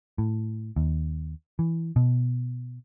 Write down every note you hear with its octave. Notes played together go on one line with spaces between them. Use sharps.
A2
D#2
E3
B2